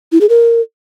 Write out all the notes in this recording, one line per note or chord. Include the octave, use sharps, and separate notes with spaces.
E4
G#4
A#4